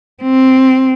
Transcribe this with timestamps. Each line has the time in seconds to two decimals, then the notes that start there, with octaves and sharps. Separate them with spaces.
0.23 C4